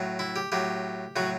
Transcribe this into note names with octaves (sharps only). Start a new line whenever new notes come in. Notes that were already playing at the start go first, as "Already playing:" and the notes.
Already playing: A2 F#3
E4
G4
A2 F#3 G4
A2 F#3 F#4